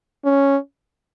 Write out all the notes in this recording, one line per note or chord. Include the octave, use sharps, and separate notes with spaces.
C#4